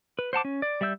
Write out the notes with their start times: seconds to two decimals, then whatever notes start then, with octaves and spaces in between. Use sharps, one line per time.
0.19 B4
0.33 C5 F#5 A5 D6
0.45 C#4
0.62 D5
0.81 G3 D5 E5 E6 G6